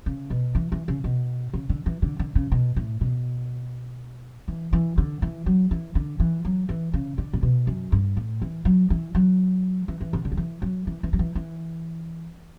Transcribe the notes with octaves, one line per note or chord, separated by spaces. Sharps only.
C#3
B2
E3
E3
C#3
B2
C#3
D3
E3
D3
D3
C#3
B2
A2
B2
E3
E3
D3
E3
F#3
E3
D3
E3
F#3
E3
C#3
D3
A2
B2
F#2
G2
A2
E3
F#3
E3
F#3
E3
E3
D3
D3
F#3
E3
F#3
E3
E3
F#3
E3
E3